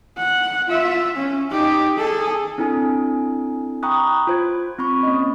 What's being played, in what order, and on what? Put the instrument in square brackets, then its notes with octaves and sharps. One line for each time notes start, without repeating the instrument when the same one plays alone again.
[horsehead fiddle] F#5
F4 E5
C#4
D#4 G4
G#4 A4
[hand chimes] C4 D4 E4 A4 G#5
G5 A#5 B5 C#6 D#6 F#6
F4 C5 G#6
C4 B5 C#6
A#3 C#4 D#5